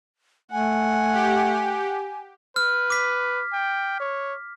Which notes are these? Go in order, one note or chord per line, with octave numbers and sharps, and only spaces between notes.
A3 F#5 G#5
G4
B4 F6
D6 B6
G5
C#5